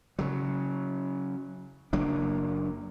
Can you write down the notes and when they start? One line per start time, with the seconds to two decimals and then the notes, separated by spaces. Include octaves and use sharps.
0.19 C#3 F#3
1.93 F#1 F#3 A#3 D4